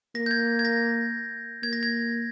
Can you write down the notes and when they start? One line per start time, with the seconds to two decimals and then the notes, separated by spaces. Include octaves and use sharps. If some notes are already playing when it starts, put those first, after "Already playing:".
0.15 A#3 A#6
0.26 G6
0.31 G#6
0.59 G#6
0.65 A#6
1.63 A#3 G#6
1.73 A#6
1.83 G#6